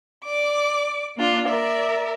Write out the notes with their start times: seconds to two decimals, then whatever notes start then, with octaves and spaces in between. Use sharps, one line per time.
0.25 D5 D6
1.17 A#3 D4 F4
1.48 A#4 D5 E5